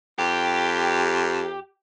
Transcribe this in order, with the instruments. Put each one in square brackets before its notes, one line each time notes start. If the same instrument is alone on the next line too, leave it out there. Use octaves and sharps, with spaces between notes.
[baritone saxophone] F2 [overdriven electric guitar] G4